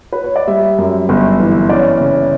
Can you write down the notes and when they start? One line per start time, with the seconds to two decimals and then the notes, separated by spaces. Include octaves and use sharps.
0.13 B4
0.24 C#5
0.36 D5
0.47 G3 E5
0.78 F#2
1.09 G1
1.40 E3
1.69 C#4 D5
2.00 C#3